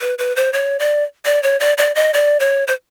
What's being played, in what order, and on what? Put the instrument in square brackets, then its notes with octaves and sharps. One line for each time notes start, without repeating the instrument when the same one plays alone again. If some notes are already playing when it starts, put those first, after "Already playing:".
[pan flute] B4
B4
C5
C#5
D5
D5
C#5
D5
D5
D#5
D5
C#5
C5